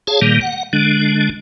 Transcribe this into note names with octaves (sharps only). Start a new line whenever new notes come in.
G#4 C#5 F5 A5
A#2 D#3 G3 A#3
F#5
D3 G#3 D4